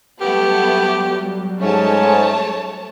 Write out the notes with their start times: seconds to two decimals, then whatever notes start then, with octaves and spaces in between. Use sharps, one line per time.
0.21 F#3 G3 A3 B3 G4
1.61 G#2 A3 C#4 C#5 A5